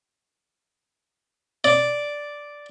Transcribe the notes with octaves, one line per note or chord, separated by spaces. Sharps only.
D5